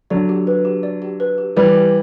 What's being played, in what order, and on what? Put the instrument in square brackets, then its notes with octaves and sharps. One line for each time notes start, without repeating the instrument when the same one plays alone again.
[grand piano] D3 F#3 [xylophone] D5
[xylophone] G4
B4
G4
D5
G4
B4
G4
[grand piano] E3 G3 [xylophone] D5
[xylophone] G4